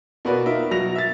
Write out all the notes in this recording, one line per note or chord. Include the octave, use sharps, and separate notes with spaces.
B2 A#3 F#4 B4 D5
D#4 F4 A#4 E5
B2 F#3 A#6 F7
E5 A6